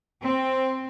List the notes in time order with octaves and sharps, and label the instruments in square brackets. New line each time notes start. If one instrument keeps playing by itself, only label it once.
[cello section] C4